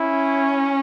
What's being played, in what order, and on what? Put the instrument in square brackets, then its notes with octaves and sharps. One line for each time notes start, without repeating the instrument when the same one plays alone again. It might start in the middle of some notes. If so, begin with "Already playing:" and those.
Already playing: [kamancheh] C#4 [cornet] E4